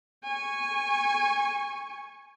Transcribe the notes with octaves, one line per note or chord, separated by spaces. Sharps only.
G#5 C#6